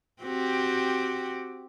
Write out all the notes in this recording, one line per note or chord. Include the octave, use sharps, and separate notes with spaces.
C4 F#4 G4